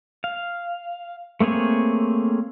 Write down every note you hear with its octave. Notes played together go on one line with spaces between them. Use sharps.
F5
A3 A#3 C4 G#4 C#5